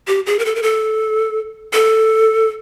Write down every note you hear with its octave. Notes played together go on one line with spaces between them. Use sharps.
G4
G#4
A#4
A4
A#4
A4
A4